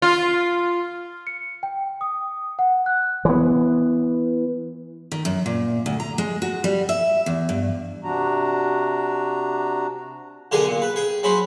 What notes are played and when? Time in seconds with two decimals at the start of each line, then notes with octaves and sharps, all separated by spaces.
0.02 F4
1.27 C#7
1.63 G5
2.01 D#6
2.59 F#5
2.86 F#6
3.25 E3 B3
5.12 D#3
5.25 F#2
5.46 A#2
5.86 D2
6.00 A#5
6.18 G#3
6.42 F#4
6.64 G3
6.89 E5
7.26 E2
7.49 G2
8.04 C3 D4 F#4 A#5
10.52 B1 D3 G4 G#4 A#4 G#5
10.67 A#2
10.82 B4
10.96 G#4 G5
11.23 F#3 G#3 C4 B5